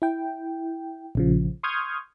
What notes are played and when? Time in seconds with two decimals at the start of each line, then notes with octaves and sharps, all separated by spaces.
0.02 E4 G5
1.15 A#1 C#3 F3
1.63 C6 C#6 D#6 F6 G6 G#6